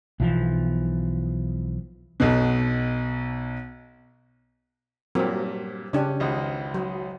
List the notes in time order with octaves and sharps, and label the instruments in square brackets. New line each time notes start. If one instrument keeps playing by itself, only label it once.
[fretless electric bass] B1 E3 F3
[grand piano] B1 B2
[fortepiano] G2 A#2 [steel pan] F#3 C4 A#4
[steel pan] C#3 D4 G4 [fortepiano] C#4
[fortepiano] G#1 C#2 D#5
[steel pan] F#3